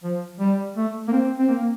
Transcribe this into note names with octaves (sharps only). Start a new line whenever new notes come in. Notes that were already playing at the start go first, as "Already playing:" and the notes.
F3
G3
A3
A#3
C4
C4
A#3